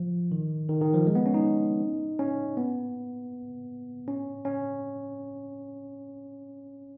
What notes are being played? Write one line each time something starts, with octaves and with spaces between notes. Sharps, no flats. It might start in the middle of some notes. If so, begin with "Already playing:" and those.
Already playing: F3
D#3
D#3
D#3
F3
G#3
B3
C#4
D#4
C#4
B3
C#4
C#4